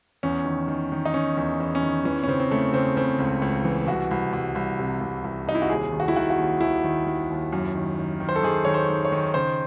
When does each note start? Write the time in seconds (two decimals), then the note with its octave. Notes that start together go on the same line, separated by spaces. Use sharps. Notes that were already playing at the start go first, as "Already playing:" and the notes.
0.23 E2 C#4
0.45 D#3
0.68 D#3
0.92 D#3
1.05 D#4
1.14 D#3 C#4
1.37 E2
1.60 E2
1.75 C#4
1.83 D#3
2.05 E3 C#4
2.23 C#4
2.27 C#3 C4
2.40 C4
2.51 C#3 A3
2.73 C#3 C4
2.97 C#3 C4
3.19 C#2
3.42 C#2
3.65 E3
3.87 C2 F#4
4.11 C2
4.33 C2
4.55 C2
4.79 C3
5.01 C2
5.24 C2
5.47 C3 D#4
5.55 E4
5.62 F#4
5.69 D#2 G#4
5.92 D#3
6.00 F#4
6.08 E4
6.16 D#3 F#4
6.30 F#4
6.38 D#2
6.61 D#2 E4
6.84 D#3
7.06 D#3
7.30 D#2
7.53 F#2
7.75 D#3
7.98 D#3
8.20 D#3
8.29 C5
8.36 A4
8.43 D#3 G#4
8.65 D#3 C#5
8.74 C5
8.89 D#3
9.05 C#5
9.12 D#3
9.34 C#3 C5